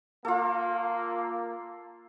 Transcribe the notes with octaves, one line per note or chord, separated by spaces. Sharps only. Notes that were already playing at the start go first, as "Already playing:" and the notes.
A#3 F4 A4